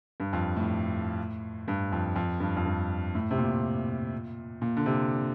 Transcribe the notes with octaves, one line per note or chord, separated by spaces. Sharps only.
G2
F2
A2
G2
F2
F2
G2
F2
G2
A2
C3
A#2
A#2
D3
C3